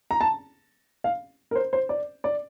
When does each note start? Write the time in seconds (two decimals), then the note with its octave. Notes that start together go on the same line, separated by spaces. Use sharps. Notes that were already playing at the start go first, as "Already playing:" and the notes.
0.11 A#5
0.21 A5
1.04 F5
1.51 A#4
1.55 C5
1.73 C5
1.89 D5
2.24 D5